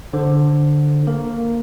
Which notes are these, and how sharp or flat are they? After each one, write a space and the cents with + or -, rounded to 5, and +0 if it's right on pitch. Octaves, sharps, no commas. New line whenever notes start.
D3 +0 C5 +0
A#3 -5 A#4 +0